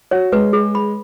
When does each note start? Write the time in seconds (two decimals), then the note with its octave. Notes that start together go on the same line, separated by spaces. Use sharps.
0.11 F#4 C#5
0.32 G#3 B4
0.53 G#4
0.75 B5